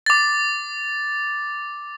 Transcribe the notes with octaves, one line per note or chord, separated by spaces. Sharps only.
D6 A6